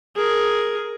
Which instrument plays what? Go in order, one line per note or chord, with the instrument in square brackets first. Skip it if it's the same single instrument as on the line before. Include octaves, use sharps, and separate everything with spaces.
[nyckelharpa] G#4 A#4